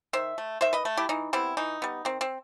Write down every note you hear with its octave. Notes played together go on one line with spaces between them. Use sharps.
D#3 C5 E5
A3
D#3 C5 E5
B4 D#5
A3
E4 G4
E3 D#4
G3 B3 C4 E4
E3 D#4
G3 B3
D#3 C4
C4